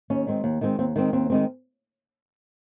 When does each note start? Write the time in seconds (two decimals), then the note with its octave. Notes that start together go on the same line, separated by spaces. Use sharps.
0.10 D#2 C#4
0.27 D#3 G#3 C4
0.44 D#2
0.61 D#3 G#3 C4
0.79 D#2 C4
0.96 D#3 G#3 C4
1.13 D#2 C4
1.30 D#3 G#3 C4